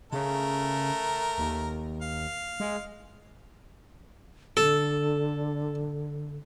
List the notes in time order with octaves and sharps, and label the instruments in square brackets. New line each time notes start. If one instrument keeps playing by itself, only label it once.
[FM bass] C#3 [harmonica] A3 A#4
[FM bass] D#2
[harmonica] F5
[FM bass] G#3
[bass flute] D3 [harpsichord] A4